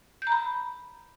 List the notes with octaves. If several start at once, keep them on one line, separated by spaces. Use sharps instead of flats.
A#5 B5 G6